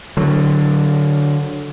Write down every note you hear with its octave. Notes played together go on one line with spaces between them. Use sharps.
D3 F#3